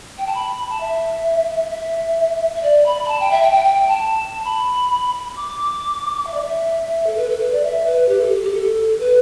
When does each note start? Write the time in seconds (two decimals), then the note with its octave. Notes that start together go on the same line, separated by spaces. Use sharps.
0.18 G5
0.27 A5
0.35 B5
0.57 B5
0.69 A5
0.81 E5
1.71 E5
2.56 E5
2.63 D5
2.86 B5
3.04 B5
3.08 A5
3.20 G5
3.31 E5
3.43 G5
3.53 G5
3.65 G5
3.77 G5
3.88 A5
3.99 A5
4.45 B5
5.36 D6
6.27 E5
6.34 D5
6.41 E5
7.07 A4
7.17 B4
7.30 A4
7.41 B4
7.52 D5
7.64 E5
7.86 B4
8.09 G4
8.21 A4
8.32 G4
8.43 G4
8.54 A4
9.00 B4